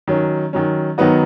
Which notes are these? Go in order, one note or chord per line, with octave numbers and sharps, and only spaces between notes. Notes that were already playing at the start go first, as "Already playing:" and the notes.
D#3 F#3 C#4
D#3 F#3 C#4
D#3 F#3 B3 D#4 F#4